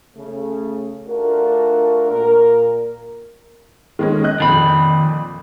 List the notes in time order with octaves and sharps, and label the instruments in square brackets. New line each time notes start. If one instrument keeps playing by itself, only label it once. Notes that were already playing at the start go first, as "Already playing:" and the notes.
[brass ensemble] C#3 A3
A3 D4 F4 F#4 A#4
A#2 A#4
[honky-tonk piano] D#3 G#3 C#4
D#5 F#6 G6
[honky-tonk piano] F2 A#2 [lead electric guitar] D#3 B5